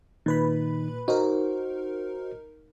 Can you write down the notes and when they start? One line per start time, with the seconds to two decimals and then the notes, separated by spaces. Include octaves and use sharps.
0.26 A#2 D#3 D#4 B4 B5
1.08 D#4 F#4 A#4 C5